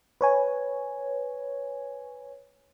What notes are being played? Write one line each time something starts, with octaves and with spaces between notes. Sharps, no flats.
B4 C#5 G#5